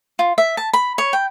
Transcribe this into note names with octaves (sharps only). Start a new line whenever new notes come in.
F4
E5
A5
B5
C#5
G5